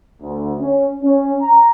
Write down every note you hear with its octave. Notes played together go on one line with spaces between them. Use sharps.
D2
C#4
C#4
A#5